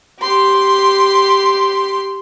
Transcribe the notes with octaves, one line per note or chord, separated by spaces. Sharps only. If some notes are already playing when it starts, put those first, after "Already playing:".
G4 C6